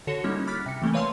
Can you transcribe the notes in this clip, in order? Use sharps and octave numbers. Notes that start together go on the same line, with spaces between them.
D3 F#4 A4 C#5 F#5 C#7
G3 G#3 A#3 C#4 D#4 E4
B5 D6 F6 F#6 A6 B6
C3 C#7
E3 G3 A3 A#3 C4
B4 C#5 F5 A5 C6 E6